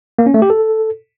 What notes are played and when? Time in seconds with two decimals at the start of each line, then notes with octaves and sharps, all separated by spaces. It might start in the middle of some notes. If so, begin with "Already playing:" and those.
0.19 A#3
0.26 C#4
0.34 A3
0.42 G4
0.50 A4